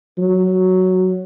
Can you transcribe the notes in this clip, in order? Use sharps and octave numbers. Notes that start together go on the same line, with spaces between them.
F#3